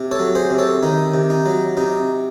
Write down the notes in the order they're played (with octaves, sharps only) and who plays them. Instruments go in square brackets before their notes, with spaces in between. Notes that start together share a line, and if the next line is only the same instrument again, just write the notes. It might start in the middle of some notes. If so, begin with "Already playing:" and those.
Already playing: [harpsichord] C3
A4 C#5
F#3
G#4 C5
C3
A4 C#5
D#3 D#4
C3
D#4
F#3
C3 D#4